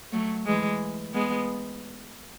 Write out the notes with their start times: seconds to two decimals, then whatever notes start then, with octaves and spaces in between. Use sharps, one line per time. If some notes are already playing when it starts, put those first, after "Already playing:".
0.12 F#3 A3
0.46 E3 G#3
1.14 G#3 B3